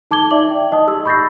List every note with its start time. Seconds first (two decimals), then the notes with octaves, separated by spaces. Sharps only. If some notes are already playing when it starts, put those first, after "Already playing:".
0.11 D#4 A5 D6 G#6 G7
0.31 D#4 D5 E5 D6 F#7
0.50 G5
0.71 D#4 D#5 A5 D#6
0.87 G4 E6
1.05 B5 C#6 G6 A6 A#6 C7